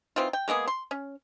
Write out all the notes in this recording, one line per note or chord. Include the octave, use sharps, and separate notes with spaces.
E3 C4 D#4 F4
G5
G#3 A#3 B3 G#4
C6
C#4